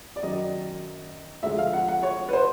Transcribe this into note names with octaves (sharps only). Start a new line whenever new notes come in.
D5
F#2 D#3 F#3 D#5
D2 D3 F3 G#3 E5
F5
F#5
F#5
C#5
B4
C5